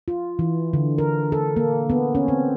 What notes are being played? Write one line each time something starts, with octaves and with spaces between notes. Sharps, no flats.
F4
E3
D3
A#4
A4
A#3
B3
C#4
C4